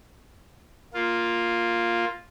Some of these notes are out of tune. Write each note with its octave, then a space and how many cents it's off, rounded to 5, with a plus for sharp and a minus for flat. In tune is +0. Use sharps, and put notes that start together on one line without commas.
A#3 +0 F4 +0